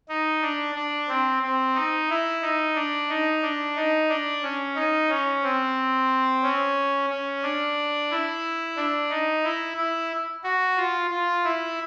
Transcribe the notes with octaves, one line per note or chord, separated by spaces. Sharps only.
D#4
D4
D4
C4
C4
D#4
E4
D#4
D4
D#4
D4
D#4
D4
C#4
D#4
C#4
C4
C#4
C#4
D4
E4
D4
D#4
E4
E4
F#4
F4
F4
E4